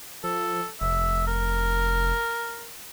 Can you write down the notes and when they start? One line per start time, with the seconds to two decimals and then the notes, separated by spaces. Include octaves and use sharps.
0.24 F3 A4
0.81 F1 E5
1.27 A#4